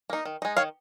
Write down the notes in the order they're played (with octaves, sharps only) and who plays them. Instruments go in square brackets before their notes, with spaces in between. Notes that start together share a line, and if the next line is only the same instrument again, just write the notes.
[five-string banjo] A#3 D#4
D#3
G#3 D#4
D#3 C#5 F5